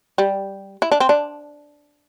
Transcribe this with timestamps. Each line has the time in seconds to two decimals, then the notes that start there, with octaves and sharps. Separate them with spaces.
0.18 G3
0.82 E4
0.92 D4
1.00 C4
1.09 D4